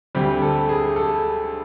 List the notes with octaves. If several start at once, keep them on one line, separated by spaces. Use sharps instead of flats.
D2 D3 G3 C4 G4
A4
G#4
A4